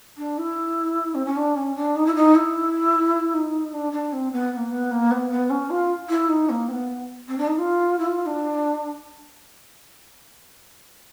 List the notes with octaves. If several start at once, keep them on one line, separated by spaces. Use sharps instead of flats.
D4
E4
C4
C#4
D4
C#4
D4
D#4
E4
D#4
E4
D#4
D4
D4
C4
B3
B3
A#3
B3
A#3
B3
B3
C#4
F4
E4
D#4
A#3
C4
B3
C4
D4
D#4
F4
E4
F4
D4